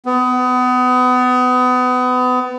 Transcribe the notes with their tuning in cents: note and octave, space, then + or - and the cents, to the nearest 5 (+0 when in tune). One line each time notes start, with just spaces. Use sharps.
B3 +30